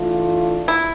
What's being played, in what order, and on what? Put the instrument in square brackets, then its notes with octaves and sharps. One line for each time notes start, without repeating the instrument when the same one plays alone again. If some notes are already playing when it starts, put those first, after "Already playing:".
Already playing: [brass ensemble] E3 A3 D4 F4
[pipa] E4